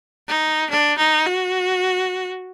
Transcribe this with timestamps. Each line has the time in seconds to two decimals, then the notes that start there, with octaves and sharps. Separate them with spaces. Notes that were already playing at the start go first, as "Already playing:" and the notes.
0.28 D#4
0.70 D4
0.98 D#4
1.26 F#4